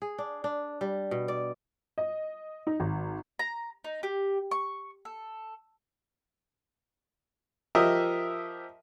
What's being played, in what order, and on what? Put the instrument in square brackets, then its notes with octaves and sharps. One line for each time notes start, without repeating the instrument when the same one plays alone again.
[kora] G#4
D4
D4
G3
B2
D5
[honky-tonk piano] D#5
D#4
G#1
[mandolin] A#5
D#4
G4
C#6
A4
[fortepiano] F3 G4 A#4 D#5 E5